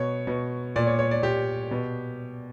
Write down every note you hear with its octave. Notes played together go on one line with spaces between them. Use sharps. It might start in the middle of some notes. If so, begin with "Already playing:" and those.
Already playing: B2 C#5
B2
A#2 D5
C#5
C#5
D5
A#2 G4
B2